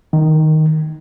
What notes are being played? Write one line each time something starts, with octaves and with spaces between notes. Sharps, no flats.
D#3